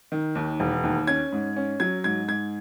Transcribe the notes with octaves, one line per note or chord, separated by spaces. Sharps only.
D#3
D#2
E1
D#2
C#4 G#6
G#2
C#4
F#3 G#6
G#2 G#6
G#2 G#6